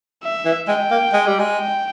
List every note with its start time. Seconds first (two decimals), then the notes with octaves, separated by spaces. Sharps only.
0.23 E5
0.45 E3
0.68 G#3 G5
0.91 A#3
1.13 G#3
1.27 G3
1.39 G#3
1.59 G5